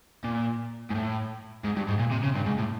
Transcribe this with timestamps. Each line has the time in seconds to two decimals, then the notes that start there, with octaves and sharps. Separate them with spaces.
0.24 A#2
0.90 G#2
0.95 A2
1.65 G#2
1.77 G2
1.88 G#2
1.99 A#2
2.11 C3
2.23 C#3
2.35 G2
2.46 G#2
2.58 A2